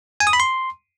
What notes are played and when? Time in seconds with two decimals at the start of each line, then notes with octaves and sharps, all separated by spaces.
0.20 G#5
0.27 D#6
0.33 B5
0.40 C6